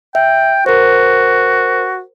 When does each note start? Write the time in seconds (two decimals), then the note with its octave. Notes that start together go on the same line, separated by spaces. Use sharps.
0.15 E5 G5
0.66 F#4 A#4 C5